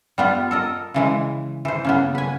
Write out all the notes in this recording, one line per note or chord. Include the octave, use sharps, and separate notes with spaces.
G3 B3 F4
A4 A#4 D#5
C#3 E3 G#3
E3 C5
C#3 A#3 B3
B4 G#5